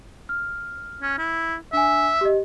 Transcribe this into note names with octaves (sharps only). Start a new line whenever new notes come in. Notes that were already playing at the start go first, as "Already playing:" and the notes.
F6
C#4
E4
D4 E5 G#5
G4 D#5